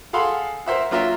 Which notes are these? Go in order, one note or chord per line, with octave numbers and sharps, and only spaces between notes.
G#4 A4 F5 F#5 B5 C6
A#4 C5 E5 F#5
F#3 A#3 F4 A#4 E5